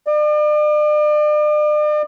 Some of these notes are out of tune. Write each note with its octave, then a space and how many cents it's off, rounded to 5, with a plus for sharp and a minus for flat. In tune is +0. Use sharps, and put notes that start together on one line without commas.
D5 +40